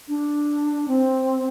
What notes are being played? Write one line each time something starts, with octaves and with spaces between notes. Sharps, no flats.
D4
C4